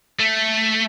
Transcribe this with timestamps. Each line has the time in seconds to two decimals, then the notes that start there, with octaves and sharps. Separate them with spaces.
0.19 A3